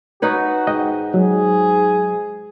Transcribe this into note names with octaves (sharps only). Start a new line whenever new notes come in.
D#4 F#4 B4 C#5
G#2 D#5 F#5 G5
F#3 G#4